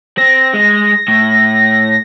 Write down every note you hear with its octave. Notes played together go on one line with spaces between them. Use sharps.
C4 A#6
G#3
A2